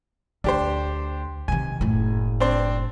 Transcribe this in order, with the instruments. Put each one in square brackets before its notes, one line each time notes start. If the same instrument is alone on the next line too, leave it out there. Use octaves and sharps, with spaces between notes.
[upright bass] D2 [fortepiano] D4 G4 C5
[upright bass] C3 D#3 [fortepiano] G#5
[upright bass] F#1 A2
[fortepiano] C4 D4 C5